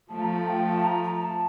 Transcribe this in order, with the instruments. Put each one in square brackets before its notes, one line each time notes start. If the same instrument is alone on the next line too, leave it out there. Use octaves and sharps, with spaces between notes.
[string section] F3 A3 [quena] A5
[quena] A#5
A5
G5
A5
A#5
A#5
A#5
A5